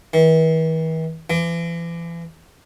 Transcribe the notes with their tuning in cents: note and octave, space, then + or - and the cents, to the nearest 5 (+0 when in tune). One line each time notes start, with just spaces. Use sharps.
E3 -45
E3 +35